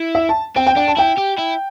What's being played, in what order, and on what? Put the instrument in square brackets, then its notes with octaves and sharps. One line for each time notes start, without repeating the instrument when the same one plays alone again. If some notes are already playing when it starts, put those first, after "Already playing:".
Already playing: [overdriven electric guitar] E4
[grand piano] E5
A5
[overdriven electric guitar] C4 [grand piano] G5
[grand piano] G5
[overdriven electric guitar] D4 [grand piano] G5
[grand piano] A5
[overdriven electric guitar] E4 [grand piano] G5
[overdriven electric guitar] G4
E4